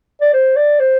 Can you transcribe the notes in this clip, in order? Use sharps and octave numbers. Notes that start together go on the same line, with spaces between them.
D5
C5
D5
C5